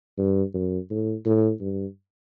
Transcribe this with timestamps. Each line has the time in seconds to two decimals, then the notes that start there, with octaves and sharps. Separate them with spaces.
0.18 G2
0.54 F#2
0.90 A2
1.26 A2
1.60 G2